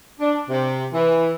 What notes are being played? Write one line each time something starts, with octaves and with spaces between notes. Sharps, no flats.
D4
C3
E3